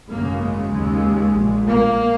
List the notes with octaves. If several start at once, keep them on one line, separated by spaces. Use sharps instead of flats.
G#1 F#2 C#3 A#3
G#3
D#2 C#3
A#1 A#2
A#3